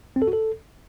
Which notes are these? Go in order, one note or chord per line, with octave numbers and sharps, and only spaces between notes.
C4
A4
F#4
A4